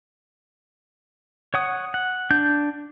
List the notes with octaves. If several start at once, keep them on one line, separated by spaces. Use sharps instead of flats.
C#5 F#5 D#6
F#5
D4 G6